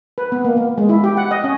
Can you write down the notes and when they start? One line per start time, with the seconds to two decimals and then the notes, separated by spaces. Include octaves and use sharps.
0.18 B4
0.32 B3
0.45 A#3
0.57 A#3
0.78 G#3
0.89 E4
1.04 G4
1.17 F#5
1.31 D#5
1.44 C#4